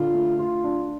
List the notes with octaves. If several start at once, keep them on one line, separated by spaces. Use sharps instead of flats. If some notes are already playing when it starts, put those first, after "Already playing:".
Already playing: D3 F4
A3
F4
D4